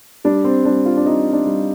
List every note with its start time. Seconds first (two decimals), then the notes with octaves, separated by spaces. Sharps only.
0.24 G3 D4
0.44 C4
0.65 G3 D4
0.85 F4
0.97 D4
1.06 G3 D#4
1.33 D4
1.46 G3